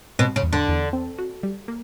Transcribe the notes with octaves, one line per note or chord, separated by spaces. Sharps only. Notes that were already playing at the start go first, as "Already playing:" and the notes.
B2 C4
C#3
E2
D3
E2
C4
F#4
G3
A#3